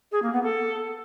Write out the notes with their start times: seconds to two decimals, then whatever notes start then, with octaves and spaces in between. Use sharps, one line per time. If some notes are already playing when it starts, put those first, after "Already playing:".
0.11 G#4
0.22 A#3
0.32 B3
0.43 A4